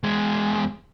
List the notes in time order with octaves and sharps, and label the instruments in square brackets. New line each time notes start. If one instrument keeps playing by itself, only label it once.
[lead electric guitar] E2 G#3